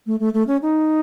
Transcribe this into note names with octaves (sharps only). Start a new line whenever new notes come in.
A3
A3
A3
C#4
D#4